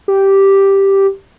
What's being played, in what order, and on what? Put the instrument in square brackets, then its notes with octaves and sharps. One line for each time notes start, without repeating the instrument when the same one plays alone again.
[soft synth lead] G4